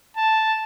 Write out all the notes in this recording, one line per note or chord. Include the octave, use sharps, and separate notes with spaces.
A5